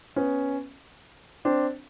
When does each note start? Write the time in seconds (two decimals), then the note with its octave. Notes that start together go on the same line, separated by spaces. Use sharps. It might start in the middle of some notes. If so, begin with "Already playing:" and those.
0.16 B3 C#4
1.45 C4 D4